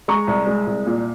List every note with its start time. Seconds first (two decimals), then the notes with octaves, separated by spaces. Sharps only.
0.08 G#3 A#5 C#6
0.27 C2
0.47 G#3
0.67 C2
0.86 A#2